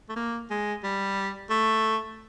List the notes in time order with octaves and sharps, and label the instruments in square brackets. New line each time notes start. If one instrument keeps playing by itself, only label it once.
[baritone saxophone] A3
A#3
G#3
G3
A3